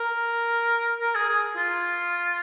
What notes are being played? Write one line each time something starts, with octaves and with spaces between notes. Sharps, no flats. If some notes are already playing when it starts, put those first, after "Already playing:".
Already playing: A#4
A#4
G#4
G#4
F4